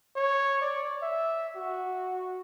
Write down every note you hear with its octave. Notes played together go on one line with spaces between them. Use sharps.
C#5
D5
E5
F#4